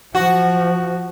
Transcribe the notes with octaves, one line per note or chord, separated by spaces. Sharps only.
F3 F#4